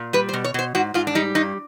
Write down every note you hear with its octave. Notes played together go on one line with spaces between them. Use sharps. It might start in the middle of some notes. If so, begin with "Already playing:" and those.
Already playing: A#2
G3 B4
C5
B2
C#5
B2 C5
G#2 F#4
G#2 F4
D4
G3 D#4
G2 D#4